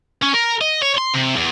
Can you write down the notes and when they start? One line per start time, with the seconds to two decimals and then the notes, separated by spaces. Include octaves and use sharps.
0.23 C#4
0.34 A#4
0.61 D#5
0.82 C#5
0.97 C6
1.14 C3
1.36 E2